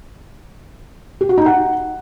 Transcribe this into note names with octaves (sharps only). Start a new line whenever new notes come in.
G4
F#4
D#4
F#5